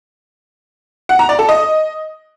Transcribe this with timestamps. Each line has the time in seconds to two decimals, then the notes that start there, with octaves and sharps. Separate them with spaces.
1.09 F#5
1.19 A#5
1.29 D5
1.39 A4
1.49 D#5